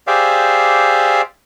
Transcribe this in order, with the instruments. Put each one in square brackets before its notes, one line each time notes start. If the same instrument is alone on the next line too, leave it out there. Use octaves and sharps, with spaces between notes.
[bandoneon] G4 G#4 C5 D5 E5 F5